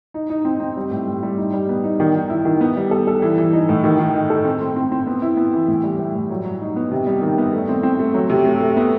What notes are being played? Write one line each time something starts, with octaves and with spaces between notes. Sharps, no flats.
D#4
D#4
C4
C4
G3
A2
A2
G3
D#4
G3
B3
D#4
D#3
D#3
E4
D#3
B3
G3
A4
A4
E3
E3
D#4
A2
D#3
D#3
D#4
A4
C4
C4
C4
C4
B3
E4
B3
E3
A2
G3
A2
A2
F#3
F#3
D#4
B3
C3
G3
D#3
B3
A3
C4
C4
A3
F#3
C3
A3
A3
B3